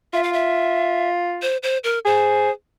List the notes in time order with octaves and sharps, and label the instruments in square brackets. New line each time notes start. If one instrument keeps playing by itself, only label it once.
[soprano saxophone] F4 [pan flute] E5
[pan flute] F5
E5
C5
C5
A#4
[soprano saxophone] G#4 [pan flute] C5